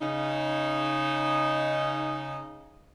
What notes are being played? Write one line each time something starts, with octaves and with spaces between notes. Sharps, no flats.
C#3 D#4